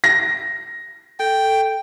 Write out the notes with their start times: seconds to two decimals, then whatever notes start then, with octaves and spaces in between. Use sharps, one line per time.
0.04 A#6
1.20 A4 G5